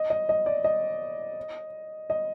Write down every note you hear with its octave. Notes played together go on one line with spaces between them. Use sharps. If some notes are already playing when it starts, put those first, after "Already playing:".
Already playing: D#5
D#5
D#5
D5
D#5
D#5